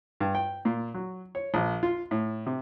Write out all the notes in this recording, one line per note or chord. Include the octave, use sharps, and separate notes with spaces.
G2
G5
A#2
F#3
C#5
A#1
F4
A2
C3